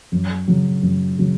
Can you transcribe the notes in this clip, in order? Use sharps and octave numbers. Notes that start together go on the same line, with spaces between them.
F#2
C#3 F#3
F#2
C#3 F#3